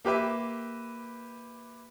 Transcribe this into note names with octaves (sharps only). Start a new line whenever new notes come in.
A#3 G4 B4 E5